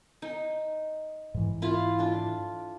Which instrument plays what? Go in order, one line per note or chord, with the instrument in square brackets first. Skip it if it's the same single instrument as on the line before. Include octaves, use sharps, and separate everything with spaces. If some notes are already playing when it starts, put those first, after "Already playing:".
[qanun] D#4
[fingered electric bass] G#2 E3
[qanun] E4 F4 F5
A3 D4 F4